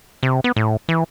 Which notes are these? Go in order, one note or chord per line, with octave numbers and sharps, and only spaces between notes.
C3
B3
A2
E3